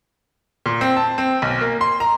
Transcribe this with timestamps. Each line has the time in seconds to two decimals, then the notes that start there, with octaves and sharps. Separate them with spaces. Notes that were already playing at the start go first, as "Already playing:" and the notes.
0.66 A#2
0.81 C4
0.97 A5
1.18 C4
1.42 B1
1.61 A#3
1.81 C6
2.00 A#5